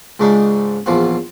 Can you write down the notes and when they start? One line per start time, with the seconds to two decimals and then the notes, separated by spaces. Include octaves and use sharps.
0.19 C#2 G#2 C#3 D4 D#4
0.86 A#1 E2 F3 F4 F#4